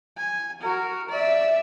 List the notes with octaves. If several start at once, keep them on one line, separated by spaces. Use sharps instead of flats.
G#5
F#4 A#4
D5 E5